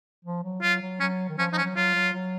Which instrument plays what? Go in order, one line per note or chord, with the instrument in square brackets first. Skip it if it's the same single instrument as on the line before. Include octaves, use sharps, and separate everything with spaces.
[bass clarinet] F3
F#3
[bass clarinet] F#3 [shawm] F4
[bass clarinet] F#3
[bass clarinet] F#3 [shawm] C#4
[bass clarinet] D#3
[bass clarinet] F3 [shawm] C#4
[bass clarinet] F3 [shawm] D#4
[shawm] C#4
[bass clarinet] F#3
[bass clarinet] F#3 [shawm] F4
[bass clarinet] F#3
F#3